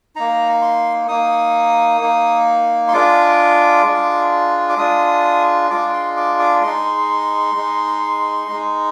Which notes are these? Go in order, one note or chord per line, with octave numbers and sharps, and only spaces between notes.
A#3 D#4 A#5
C6
A#3 D#4 D#6
A#3 D#4
C6
G#3 D4 F4 D6
G#3 D4 F4
D6
G#3 D4 F4 D#6
G#3 D4 F4 D6
C6
D6
D6
G#3 D#4 C6
G#3 D#4
G#3 D#4